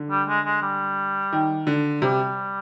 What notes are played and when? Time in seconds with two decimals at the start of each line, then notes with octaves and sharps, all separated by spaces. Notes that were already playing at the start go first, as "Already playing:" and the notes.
Already playing: D3
0.11 G3
0.28 G#3
0.46 G#3
0.62 G3
1.33 D#3
1.67 D3
2.01 C3 G3